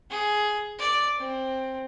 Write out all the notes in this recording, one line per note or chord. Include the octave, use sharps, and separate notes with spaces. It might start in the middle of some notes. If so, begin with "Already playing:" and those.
G#4
D5
C4